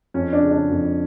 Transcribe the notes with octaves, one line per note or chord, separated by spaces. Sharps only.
F2 C#4
D4
C#3
D4
F2